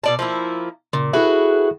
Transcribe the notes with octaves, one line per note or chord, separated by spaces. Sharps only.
B2 D5 A5
F3 A#3 E4
A#2 C#3
E4 F#4 G#4 A4 B4 E5